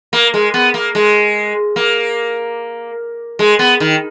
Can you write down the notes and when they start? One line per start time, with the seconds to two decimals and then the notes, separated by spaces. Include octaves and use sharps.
0.13 A#3
0.34 G#3
0.54 B3
0.74 A#3
0.95 G#3
1.76 A#3
3.39 G#3
3.59 B3
3.80 D#3